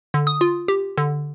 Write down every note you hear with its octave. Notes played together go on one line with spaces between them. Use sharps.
D3
D#6
F4
G4
D3